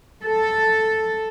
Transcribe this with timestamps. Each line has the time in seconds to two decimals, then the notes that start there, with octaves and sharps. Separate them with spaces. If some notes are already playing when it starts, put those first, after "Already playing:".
0.24 A4